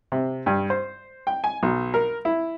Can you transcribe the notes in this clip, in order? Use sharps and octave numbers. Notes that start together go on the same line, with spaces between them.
C3
G2
C5
G5
G#5
B1
A#4
E4